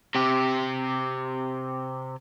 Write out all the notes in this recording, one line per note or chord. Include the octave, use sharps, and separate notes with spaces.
C3 G4